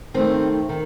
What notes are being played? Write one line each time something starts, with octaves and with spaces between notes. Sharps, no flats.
D#3 A3 C4
D#3